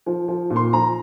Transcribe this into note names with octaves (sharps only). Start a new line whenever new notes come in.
F3
F3
A#2
C6
F3 A#5